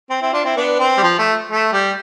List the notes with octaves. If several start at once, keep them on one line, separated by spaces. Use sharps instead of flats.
C4
C4 E4
D4 F4
C4 E4
B3 D4
C4
G3
F3
A3
A3
G3